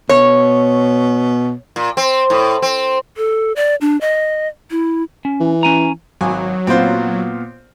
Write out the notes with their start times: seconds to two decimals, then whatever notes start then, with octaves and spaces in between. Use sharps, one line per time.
0.09 B2 C#5
1.76 A#2
1.97 C4
2.30 A2
2.62 C4
3.17 A4
3.56 D5
3.81 D4
4.01 D#5
4.71 E4
5.25 C#4
5.40 E3
5.63 C#4 G#5 A#5
6.21 G#1 F#3 G#5
6.67 A#2 B3 C4 F4 C5